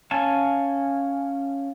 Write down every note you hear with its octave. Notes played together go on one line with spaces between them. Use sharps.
C#4 F5 G#5 A5